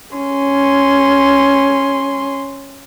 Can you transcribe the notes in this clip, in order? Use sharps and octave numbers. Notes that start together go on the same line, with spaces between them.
C#4 C6